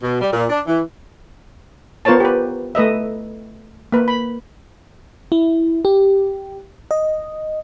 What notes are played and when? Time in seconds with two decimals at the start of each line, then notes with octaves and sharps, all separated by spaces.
0.03 B2
0.21 G3
0.33 A#2
0.50 D4
0.67 E3
2.05 B3 F4 A#4 C5 C#5 A5
2.20 G4 B4
2.75 A3 B4 D#5 E5
3.92 A#3 B4
4.08 B5
5.32 E4
5.85 G4
6.91 D#5